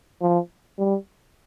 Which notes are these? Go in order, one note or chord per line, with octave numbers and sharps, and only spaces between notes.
F3
G3